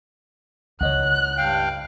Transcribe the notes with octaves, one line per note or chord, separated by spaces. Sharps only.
C#2 E4 C#5 D#5 F#5 F#6
G2 F5 G5